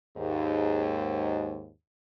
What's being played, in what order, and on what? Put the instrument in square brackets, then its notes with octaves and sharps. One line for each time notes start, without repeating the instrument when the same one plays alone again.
[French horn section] D#2 G#2